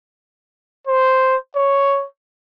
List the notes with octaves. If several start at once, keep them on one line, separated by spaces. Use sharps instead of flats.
C5
C#5